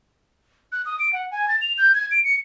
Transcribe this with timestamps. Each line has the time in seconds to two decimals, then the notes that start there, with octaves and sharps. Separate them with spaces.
0.72 F#6
0.86 D#6
0.99 D7
1.13 F#5
1.31 G#5
1.48 A6
1.61 F7
1.78 G6
1.94 G#6
2.11 D7
2.24 C#7